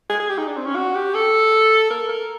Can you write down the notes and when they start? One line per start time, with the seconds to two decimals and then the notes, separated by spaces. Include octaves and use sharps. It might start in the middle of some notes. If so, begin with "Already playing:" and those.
0.10 G#4
0.20 G#4
0.29 G4
0.38 D#4
0.48 D4
0.57 C4
0.66 C#4
0.76 F#4
0.95 G4
1.15 A4
1.90 A#4
2.09 A#4